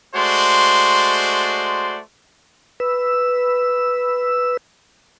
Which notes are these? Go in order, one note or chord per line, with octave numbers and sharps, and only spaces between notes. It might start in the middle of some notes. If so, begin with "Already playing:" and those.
G#3 A3 F#4 C5 D5 C6
B4 E6